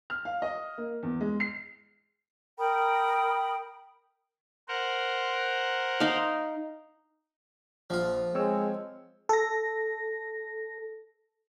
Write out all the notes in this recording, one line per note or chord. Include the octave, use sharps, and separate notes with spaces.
F6
F5
D#5
A#3
E2
G#3
C7
A#4 G5 B5 D#6
A#4 C5 F#5
D#4 F5
A#1 F3 F4
G#3 C4 C#5 E6
A4 A#6